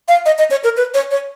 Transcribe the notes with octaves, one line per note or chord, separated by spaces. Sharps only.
F5
D#5
D#5
C#5
A#4
B4
C#5
C#5